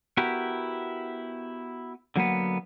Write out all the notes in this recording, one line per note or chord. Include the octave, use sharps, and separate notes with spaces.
B3 E4 F#4 G4 A#4
D3 F#3 A#3 B3